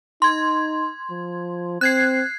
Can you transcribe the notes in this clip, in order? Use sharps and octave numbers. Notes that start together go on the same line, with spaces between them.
D#4 C6 G#6
F3
C4 F#6 G#6 C7